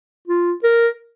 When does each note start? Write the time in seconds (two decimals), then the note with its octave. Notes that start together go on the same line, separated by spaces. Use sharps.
0.28 F4
0.63 A#4